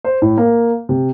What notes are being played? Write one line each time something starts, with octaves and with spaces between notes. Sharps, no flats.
C5
A2
A#3
C3